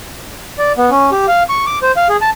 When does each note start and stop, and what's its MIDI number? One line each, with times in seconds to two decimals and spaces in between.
0.58 0.72 74
0.78 0.90 59
0.90 1.10 61
1.11 1.26 67
1.28 1.43 77
1.49 1.65 85
1.66 1.78 86
1.82 1.92 72
1.97 2.08 77
2.09 2.17 68
2.21 2.30 81